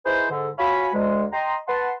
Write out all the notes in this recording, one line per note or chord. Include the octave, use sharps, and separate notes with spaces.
D#4 E4 G#4 B4 C5
G#2 D3
F4 F#4 C#5 F5 G#5 B5
D2 G#3
D#5 G5 A#5 C6
B4 F#5 A5 C6